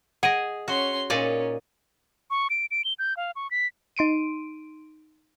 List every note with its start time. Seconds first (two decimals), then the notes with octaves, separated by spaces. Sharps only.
0.23 G#4 D#5 F#5 D7 D#7
0.68 C#4 F#4 C6
1.10 A#2 C#4 D#4 D5
2.31 C#6
2.50 D7
2.71 D7
2.85 G7
2.99 G6
3.17 F5
3.36 C#6
3.51 B6
3.97 D#4 C6 D7 D#7